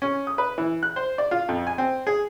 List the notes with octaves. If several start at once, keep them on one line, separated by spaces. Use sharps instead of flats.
C#4
D#6
B4
E3
F#6
C5
D5
F4
F2
G#5
C4
G#4